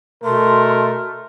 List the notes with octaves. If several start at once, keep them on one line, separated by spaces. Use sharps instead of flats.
B2 A3 A#4 C6